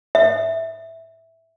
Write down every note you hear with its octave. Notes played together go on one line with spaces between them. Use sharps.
E5